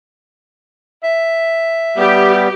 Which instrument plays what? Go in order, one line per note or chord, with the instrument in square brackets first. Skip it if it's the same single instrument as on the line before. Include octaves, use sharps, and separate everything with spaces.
[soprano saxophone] E5
[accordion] G3 B3 [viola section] G4